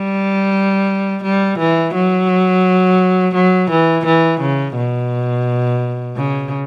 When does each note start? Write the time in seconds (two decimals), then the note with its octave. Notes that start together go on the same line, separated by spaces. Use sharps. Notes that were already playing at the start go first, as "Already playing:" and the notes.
Already playing: G3
1.24 G3
1.59 E3
1.95 F#3
3.35 F#3
3.71 E3
4.06 E3
4.41 C#3
4.76 B2
6.17 C#3